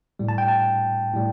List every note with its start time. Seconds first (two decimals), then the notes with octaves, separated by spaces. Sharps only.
0.19 A2 G3
0.29 A5
0.38 G5
0.48 A5
1.13 A2 G3